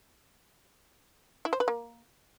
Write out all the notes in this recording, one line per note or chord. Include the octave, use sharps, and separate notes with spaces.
E4
C5
B4
A#3